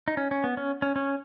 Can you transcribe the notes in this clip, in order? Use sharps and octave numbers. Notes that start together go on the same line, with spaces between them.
D#4
C#4
C#4
B3
C#4
C#4
C#4